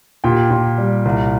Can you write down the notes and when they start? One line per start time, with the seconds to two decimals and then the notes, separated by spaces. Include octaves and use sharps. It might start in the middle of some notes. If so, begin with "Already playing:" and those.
0.24 A#2 G4 G5
0.51 A#2
0.78 G3
1.05 C2